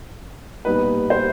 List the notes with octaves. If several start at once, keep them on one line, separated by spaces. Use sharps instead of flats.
A#2 G3 B3 D#4 B4
C5